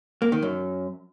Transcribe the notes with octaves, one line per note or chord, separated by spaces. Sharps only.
A#3
D#3
F#2